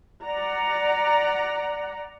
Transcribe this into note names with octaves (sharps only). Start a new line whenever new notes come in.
D5 F#5 A#5